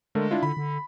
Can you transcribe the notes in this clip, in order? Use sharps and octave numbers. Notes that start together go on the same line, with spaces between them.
D3 G#3 A3 A#4
D4 E4 F4
D3 B5
D3